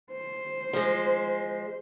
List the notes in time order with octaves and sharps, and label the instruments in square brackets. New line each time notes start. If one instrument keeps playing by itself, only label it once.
[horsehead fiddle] C5
[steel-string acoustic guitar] F3 G#3